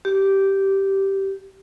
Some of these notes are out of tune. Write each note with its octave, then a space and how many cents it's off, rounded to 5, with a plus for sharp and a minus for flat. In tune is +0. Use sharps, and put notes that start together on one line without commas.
G4 -10